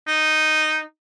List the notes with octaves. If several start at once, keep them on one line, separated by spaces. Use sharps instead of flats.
D#4